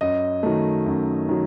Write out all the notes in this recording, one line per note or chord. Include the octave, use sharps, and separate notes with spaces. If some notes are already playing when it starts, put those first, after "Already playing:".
F#2 D#5
D#3 F#3 A3
F#2
D#3 F#3